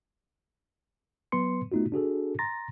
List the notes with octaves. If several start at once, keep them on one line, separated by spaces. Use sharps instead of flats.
F#3 B3 B4 C6 C#7
A3 B3 D#4 F4 F#4
D4 F#4 G#4 A4
A#5 C6 A6 A#6